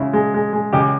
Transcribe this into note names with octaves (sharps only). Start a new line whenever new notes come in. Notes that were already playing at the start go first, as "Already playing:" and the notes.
Already playing: C#3 G#3 E4
G#3
G#3
G#3
C#2 G4